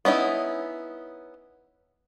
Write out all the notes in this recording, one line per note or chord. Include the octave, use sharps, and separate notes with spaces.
B3 C#4 D#4 E4